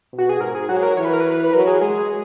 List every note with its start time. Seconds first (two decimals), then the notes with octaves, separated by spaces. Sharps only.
0.13 B2
0.18 F#4
0.29 G#4
0.40 G#2 A#4
0.55 G#4
0.69 F#3 F#4
0.76 G#4
0.83 A#4
0.97 E3 C#5
1.05 B4
1.13 A#4
1.20 B4
1.44 B4
1.53 F#3 A#4
1.67 G#4
1.81 G#3 G#4